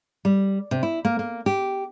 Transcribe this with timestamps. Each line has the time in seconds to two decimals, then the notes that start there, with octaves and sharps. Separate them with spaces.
0.25 G3
0.71 C3
0.83 E4
1.05 A#3
1.19 A#3
1.46 G4